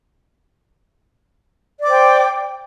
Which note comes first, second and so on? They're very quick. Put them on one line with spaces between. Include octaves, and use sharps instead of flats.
D5 D6 C5 G5